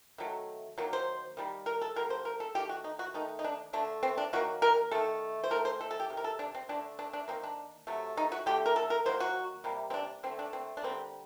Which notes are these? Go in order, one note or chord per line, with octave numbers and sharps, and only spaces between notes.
D#3 F#3 A3
D#3 F#3 A#3
C5
D#3 G3 A#3
A#4
A4
D3 G3 A#3 A#4
C5
A#4
A4
D#3 A3 G4
F#4
D#4
F#4
D#3 A3 D#4
D#4
D4
D3 A3 D4
C4
D4
D#3 F#3 A#3 F#4
A#4
D#3 A3 A4
C5
D#3 A3 A#4
C5
A4
A4
G4
C3 D#3
A#4
A4
D4
C4
D3 A3 D4
D4
D4
D#3 G3 A#3 C4
D4
C3 F#3 A3
D#4
F#4
D3 A3 G4
A#4
A4
A#4
D#3 F#3 A#3 C5
F#4
C3 G3 A#3
C4
D4
D3 A3 C4
D4
C4
D4
D3 G3 A#3 C4